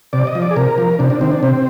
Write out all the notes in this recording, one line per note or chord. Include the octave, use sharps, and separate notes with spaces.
C3 D5
D#5
F3
D5
G#4
C3 A#4
F3
C3 D4
D4
D#3 C4
D4
C3 C4